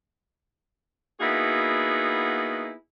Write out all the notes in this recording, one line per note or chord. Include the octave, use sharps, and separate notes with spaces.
A#3 B3 D#4 E4 F#4 G#4